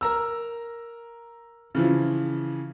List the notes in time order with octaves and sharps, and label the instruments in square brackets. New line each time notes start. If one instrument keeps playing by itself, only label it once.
[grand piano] A#4 A#5 E6
C#3 E3 F3